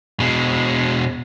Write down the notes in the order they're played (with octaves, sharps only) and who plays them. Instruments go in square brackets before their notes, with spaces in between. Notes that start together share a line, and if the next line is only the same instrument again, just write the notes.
[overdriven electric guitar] B2 G#3